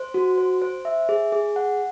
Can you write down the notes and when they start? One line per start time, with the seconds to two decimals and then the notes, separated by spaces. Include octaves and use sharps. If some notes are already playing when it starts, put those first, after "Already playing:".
Already playing: C5
0.14 F#4
0.38 C5
0.62 C5
0.85 E5
1.09 G#4
1.32 G#4
1.56 F#5